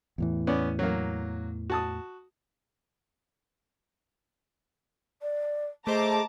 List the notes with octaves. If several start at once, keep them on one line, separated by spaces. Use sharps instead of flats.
E2 A2 E3
B3 C#4 D5
F#3 A#3
F#4 A5 D#6
D5
A3 G#4 C5 D#5 A5 A#5 D6